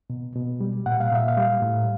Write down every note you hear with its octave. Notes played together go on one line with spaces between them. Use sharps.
B2
B2
G3
A#2 F#5
F5
A#2 E5
F5
G3
A2